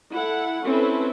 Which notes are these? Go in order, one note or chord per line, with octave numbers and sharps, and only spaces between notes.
E4 A4 F#5
C4 C#4 E4 A4 B4